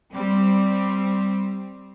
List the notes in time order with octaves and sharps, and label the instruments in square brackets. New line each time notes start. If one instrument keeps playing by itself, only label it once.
[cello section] G3 C4